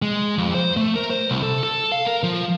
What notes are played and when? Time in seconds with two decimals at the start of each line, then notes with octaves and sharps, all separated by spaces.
0.02 G#3
0.38 F2
0.54 C5
0.77 A3
0.96 A#4
1.10 C5
1.30 C2
1.43 A4
1.64 A4
1.92 F5
2.06 A#4
2.23 F3